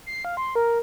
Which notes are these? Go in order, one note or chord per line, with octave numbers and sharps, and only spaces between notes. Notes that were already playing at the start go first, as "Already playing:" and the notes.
C7
F5
C6
A#4